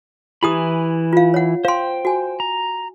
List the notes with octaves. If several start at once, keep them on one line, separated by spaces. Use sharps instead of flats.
E3 E4 G4 G#5 B5 D#6
F4 F5
C#5 F#5
C5 F5 G5 C6
F#4 G#5
A#5